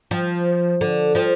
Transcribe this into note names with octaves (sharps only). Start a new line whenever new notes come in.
F3
D3
F3